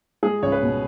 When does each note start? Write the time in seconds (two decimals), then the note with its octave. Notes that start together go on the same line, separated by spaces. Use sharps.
0.23 G#3 G#4
0.43 C#2 C#5
0.52 B4
0.62 B2